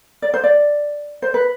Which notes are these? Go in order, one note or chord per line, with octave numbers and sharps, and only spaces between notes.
D5
C5
D5
C5
B4